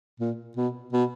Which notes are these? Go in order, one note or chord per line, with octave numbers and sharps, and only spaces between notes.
A#2
B2
B2